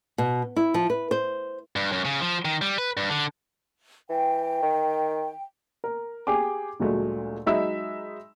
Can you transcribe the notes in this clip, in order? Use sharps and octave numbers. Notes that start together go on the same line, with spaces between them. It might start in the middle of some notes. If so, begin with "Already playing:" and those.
B2
E4
F3
B4
C5
G2
F#2
C#3
F3
D#3
G3
B4
G2
D3
E3 G5
D#3
A#4
G4 G#4 G5 G#5 D6
D2 A#2 F#3 G#3 A3
F#3 G#3 D#4 E5 B5 E6